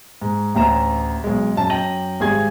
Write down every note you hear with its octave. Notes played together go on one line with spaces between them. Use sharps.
G#2
A1 D2 A#5 E7
B1 G#3
F#2 A5
F#2 G5 A#6 D#7 F#7
G#1 G3 G#4 G#5 G#6